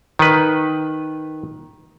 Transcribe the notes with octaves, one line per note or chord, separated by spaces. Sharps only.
D#3 B4